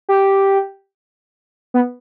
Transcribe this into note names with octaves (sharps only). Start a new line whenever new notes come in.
G4
B3